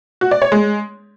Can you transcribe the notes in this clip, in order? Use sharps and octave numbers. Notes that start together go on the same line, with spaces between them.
F#4
D5
C#5
G#3